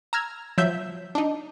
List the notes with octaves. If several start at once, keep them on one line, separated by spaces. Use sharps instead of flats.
A#5 E6 F6 G#6
F3 F#3 E5 G6
D4 D#4